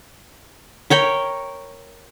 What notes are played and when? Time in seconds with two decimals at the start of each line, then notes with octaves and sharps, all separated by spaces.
0.90 A#4 C#5 G5 B5